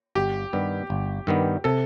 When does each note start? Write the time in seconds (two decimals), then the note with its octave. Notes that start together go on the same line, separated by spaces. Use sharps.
0.15 G1 G4
0.53 G2 D#3 G3 B3
0.90 G1
1.27 G2 D#3 G3 B3
1.64 C3 A4